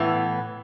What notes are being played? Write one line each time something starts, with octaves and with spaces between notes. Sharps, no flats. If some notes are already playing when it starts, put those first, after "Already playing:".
Already playing: A2 E3 B3